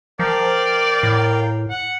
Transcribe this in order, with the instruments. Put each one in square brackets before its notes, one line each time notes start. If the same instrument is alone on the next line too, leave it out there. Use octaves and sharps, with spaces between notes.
[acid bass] F3 [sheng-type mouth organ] A#4 F5 G5 [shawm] D5
[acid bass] A2
[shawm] F#5